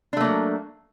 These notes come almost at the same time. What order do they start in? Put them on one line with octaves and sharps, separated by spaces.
D4 A3 A#3 F#3